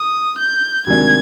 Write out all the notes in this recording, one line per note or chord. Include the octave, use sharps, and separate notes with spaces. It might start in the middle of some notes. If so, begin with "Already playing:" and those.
Already playing: D#6
G6
D2 C3 D#3 G#3 D4 G#6